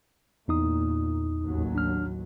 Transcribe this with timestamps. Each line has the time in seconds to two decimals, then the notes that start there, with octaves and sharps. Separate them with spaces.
0.48 E2 A#2 D#4 D#6
1.42 A1 D#2 F#3
1.75 D4 F6